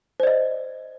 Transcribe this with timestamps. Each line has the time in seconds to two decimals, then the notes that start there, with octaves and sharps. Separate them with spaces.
0.20 C5
0.23 D5
0.27 D#5